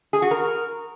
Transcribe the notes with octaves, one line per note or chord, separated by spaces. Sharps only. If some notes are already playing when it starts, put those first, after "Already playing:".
G#4
F#4
A#4